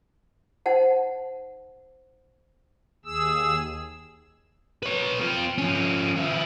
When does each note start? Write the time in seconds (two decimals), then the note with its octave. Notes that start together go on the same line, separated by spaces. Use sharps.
0.66 D#4 C5 F#5 A5
3.05 D#2 G#4 E6
4.83 B4 C#5
5.21 C4 F4
5.58 F3 C#4
6.16 F3 E4